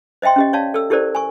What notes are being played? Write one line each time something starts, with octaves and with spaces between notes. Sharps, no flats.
C5 D#5 E5 G5 C6
C#4 G4 D#5
C#5 D5 F5 A5
A4 E6
E4 G4 A4 A#4 C5 D5
G#5 C#6